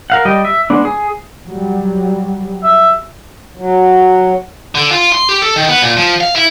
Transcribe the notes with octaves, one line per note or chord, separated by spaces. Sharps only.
A#4 F5 F#5
G3 D#5 G5
E5
G#3 B3 D4
G#4
F#3 G3
E5
F#3
D3
F4
C6
G4
A4
D#3
B3
A#2
F3
F5
E4